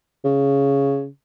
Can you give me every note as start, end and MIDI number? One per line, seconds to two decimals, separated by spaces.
0.25 1.07 49